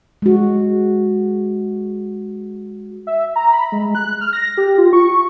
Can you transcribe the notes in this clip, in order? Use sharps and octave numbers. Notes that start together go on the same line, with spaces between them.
G#3 F#4
E5
A#5
B5
G#3
F#6
F6
A#6
G4
F4
C#6